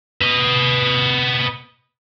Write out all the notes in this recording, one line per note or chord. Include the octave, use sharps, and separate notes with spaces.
B4 D#5